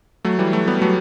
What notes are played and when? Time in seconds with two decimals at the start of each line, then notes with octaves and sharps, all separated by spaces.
0.25 F#3 A3
0.39 E3 G3
0.53 F#3 A3
0.68 G3 B3
0.82 F#3 A3